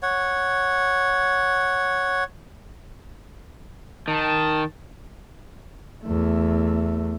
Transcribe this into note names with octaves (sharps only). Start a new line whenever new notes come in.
C#5 F#5
D#3 A5
E2 A3